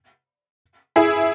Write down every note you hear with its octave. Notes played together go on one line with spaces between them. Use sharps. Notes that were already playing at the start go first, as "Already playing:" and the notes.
E4 G#4